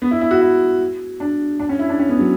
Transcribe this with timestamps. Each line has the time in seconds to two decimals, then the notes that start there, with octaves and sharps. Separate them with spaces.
0.02 B3
0.11 E4
0.21 E4
0.31 F#4
0.41 E4
1.20 D4
1.60 D4
1.69 C#4
1.79 E4
1.89 D4
1.99 C#4
2.09 B3
2.19 F#3